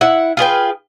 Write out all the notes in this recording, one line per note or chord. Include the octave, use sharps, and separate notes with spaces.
E4 F#5
F4 G#4 B4 G5